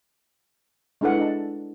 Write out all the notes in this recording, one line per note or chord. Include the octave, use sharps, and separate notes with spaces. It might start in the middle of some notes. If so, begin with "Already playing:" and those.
G#3 D4 E4 A4 B4 F#5
D4 D#5 A5